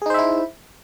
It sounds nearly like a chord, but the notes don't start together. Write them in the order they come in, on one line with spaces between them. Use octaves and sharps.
G#4 D#4 C5 E5 E4